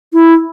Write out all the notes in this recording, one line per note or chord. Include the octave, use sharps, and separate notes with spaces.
E4